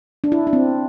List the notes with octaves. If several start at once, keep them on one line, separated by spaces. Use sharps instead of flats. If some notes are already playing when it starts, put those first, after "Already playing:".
D4
E4
D4
C4